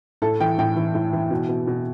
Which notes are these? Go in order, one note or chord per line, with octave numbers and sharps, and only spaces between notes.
A2 A4
E3 G5
A2 G5
E3
A2
E3
B2
B2
B2